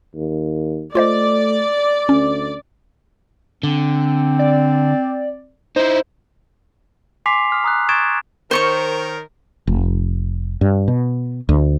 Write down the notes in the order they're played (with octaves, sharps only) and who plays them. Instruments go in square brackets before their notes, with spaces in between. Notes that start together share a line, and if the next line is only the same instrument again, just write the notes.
[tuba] D#2
[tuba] A3 [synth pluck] F4 C5 D#5 [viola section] D5
[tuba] D2 [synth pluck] C#4
[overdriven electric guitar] D3 [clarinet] C4
[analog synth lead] D5
[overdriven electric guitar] D#4 E4 [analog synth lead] C5
[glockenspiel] G#5 C6 D6 B6 C7 F7
D#6 F6
A#5 D#6 F#6
C#6 D#6 G#6 A6 D7 E7
[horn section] D#3 A#4 [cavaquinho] C5 C#5 C#6
[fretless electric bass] F1
G2
B2
D2